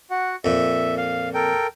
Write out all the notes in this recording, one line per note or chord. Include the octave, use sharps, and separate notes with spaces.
F#4 F#5
F2 A#2 E5
F5
A4 A#4 G5